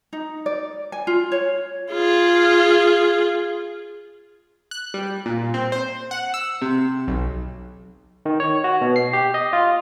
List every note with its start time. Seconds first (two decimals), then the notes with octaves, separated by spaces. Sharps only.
0.13 D#4
0.46 D5
0.92 G#5
1.07 F4
1.32 C#5
1.92 F4 G#4
4.71 F#6
4.94 G3
5.26 A#2
5.54 C4
5.72 C5
6.11 F#5
6.34 E6
6.62 C3
7.08 B1
8.26 D#3
8.40 C#5
8.64 F#4
8.81 B2
8.96 C7
9.13 G4
9.34 D#5
9.53 F4